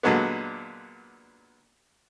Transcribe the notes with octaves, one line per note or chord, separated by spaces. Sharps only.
A#2 D3 F#3 G#3 B3